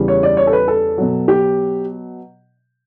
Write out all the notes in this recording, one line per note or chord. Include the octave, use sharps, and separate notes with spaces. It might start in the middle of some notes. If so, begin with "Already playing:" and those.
Already playing: E2 C#3 G3
C#5
D5
C#5
A4
B4
A4
B2 F#3
G4